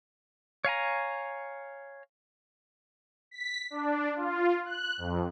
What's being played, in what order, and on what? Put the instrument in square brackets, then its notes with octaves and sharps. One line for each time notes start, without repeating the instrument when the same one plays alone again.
[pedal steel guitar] C#5 F5 G#5 A#5
[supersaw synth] B6
D4
F4
F#6
F2